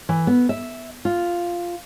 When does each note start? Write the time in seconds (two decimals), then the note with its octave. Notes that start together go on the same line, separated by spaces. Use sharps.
0.09 E3
0.27 B3
0.49 E5
1.05 F4